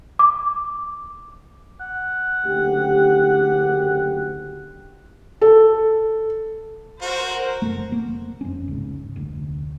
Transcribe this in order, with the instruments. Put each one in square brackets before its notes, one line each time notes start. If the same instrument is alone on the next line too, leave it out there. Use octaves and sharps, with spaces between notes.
[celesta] D6
[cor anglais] F#5
[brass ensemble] F#1 D2 G4
[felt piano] A4
[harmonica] F#4 [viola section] A#4 C5
[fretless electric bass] F#1 A3
F1 A#3
F2 C#4
C#2 G#2
F1 D2